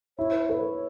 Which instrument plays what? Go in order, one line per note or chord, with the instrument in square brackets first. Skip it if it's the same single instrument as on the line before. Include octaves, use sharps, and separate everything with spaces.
[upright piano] E4 [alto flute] C#5
[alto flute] B4
[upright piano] B4 [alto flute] C#5